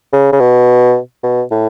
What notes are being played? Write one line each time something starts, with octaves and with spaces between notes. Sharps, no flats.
C#3
C#3
B2
B2
A2